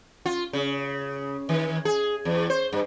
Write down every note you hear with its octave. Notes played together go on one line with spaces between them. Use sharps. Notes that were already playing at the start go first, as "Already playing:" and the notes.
F4
C#3
D#3
G#4
E2
C5
G2